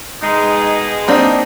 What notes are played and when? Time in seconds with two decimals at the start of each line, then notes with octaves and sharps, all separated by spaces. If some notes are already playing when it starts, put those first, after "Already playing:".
0.22 B2 G#3 D#4
1.08 A#3 C4 D4 D#4